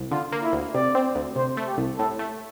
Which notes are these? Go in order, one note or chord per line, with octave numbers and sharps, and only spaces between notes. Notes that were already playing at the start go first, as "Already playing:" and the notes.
Already playing: C2
D3 F4
A#3
E4
D2
C3 D5
C4
D2
C3 C5
A3
G4
C2
A2 A4
A3